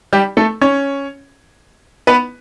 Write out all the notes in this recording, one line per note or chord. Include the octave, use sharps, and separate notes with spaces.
G3 G4
A3 A4
C#4 C#5
B3 B4